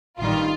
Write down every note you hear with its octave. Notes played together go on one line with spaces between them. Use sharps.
A1 G2 D#3 G3 F4